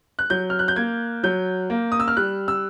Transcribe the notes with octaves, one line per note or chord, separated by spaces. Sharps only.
F#6
F#3 G6
F6
F#6
G6
A#3 G#6
F#3 G6
A#3
D#6
E6
F6
G3 F#6
E6